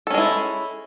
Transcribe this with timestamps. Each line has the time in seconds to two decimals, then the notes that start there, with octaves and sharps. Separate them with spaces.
0.07 A4
0.10 C#4
0.14 G#3
0.18 E4